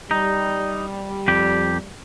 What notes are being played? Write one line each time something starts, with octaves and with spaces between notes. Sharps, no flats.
G3 D#4
F2 G4